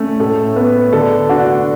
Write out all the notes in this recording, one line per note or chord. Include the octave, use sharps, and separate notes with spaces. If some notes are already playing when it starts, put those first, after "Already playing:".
Already playing: A3 C#4
A2 A4
B3
D3 A4
D4 F#4